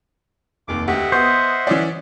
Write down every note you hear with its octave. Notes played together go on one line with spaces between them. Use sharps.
F1 D#2 D6
D2 G4 D#5 E5 F#5
B3 C5 C#6 D#6
E3 C#4 D5